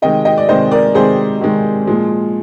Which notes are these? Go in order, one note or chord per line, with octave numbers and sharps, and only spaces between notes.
C3 D#3 G#3 D#5 G5
D#5 G5
D5
C3 D#3 G#3 C5 D#5
A#4 D5
C3 D#3 G#3 G#4 C5
C3 D#3 G#3
A#2 F3 G#3